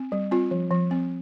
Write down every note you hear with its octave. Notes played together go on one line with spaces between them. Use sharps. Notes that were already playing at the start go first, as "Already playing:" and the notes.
Already playing: C4
G3
C4 F4
F3
F3
C4